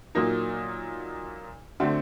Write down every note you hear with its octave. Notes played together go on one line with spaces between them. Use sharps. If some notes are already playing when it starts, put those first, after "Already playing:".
A#2 F#3 A#3 D#4
D3 A3 C4 F#4